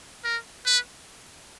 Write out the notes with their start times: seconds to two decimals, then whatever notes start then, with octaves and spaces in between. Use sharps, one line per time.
0.25 A#4
0.66 B4